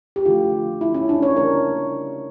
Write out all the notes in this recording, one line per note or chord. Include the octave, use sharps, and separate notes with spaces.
G4
D3 F3 A3 F4
E4
C#4
D4
C#5
C#3 G3 A#3 A#4